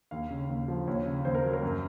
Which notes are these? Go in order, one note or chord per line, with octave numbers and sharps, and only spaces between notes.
D#2 F5
C#3
D#2
F3
D#2 C#5
C#3
D#2 C5
A#4
F#3
A#4
F#2